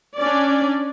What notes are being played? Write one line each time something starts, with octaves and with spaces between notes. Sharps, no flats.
C#4 D4 D5